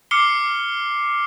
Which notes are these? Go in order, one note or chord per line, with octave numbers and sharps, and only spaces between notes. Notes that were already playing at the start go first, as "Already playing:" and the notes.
D6 F6 C7 C#7 G7